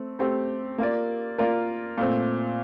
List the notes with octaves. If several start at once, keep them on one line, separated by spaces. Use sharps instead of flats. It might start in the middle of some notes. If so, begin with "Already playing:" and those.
Already playing: A3 C4
A3 C4 G4
A#3 F4 A#4 D5
A#3 F4 A#4 D5
A#2 A3 C4